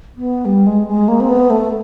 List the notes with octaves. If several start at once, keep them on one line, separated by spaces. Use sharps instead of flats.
B3
G3
G#3
G#3
A#3
C4
B3
A3